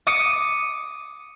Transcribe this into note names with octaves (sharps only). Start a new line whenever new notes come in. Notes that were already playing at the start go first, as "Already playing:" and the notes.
D6 D#6 C#7 D#7